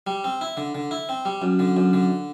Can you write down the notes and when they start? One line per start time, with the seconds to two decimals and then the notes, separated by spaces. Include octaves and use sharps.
0.07 G3
0.24 C4
0.41 E4
0.57 D3
0.75 D3
0.91 E4
1.09 C4
1.25 G3
1.42 F#2
1.59 D3
1.76 F#2
1.93 D3